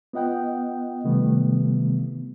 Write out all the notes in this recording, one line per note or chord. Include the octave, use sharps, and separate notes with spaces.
B3 F4 D#5 F#5 G5
C3 D#3 E3 G3 A3 B3